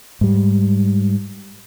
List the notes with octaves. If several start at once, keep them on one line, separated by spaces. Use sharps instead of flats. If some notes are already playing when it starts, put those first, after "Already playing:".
G#2 G3